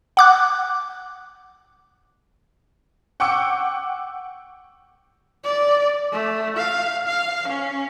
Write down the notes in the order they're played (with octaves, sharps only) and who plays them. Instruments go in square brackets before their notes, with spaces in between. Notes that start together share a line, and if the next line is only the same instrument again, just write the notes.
[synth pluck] F#5 D6 F#6
[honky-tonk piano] F#5 G5 C#6 D6 E6 C#7
[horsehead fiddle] D5
A3
F5
F5
C#4